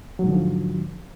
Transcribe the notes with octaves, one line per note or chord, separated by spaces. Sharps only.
G#2 D3 F3 F#3